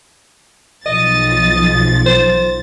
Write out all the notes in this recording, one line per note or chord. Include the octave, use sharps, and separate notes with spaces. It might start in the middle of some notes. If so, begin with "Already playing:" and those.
B1 F3 D#5 A6
C5